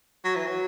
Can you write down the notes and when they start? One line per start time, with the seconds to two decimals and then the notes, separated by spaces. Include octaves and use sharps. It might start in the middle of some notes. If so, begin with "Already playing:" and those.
0.24 F#3
0.36 E3
0.47 F#3